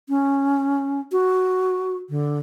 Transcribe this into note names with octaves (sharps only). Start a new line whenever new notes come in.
C#4
F#4
D3